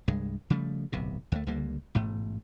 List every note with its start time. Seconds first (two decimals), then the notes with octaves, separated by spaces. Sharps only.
0.08 C2 G2 G#3
0.50 C#3 F3 G3 A3
0.92 D1 B1 C3
1.32 D2 A3
1.47 C#2 D3 G3 A#3
1.95 A1 G#2 B2 A3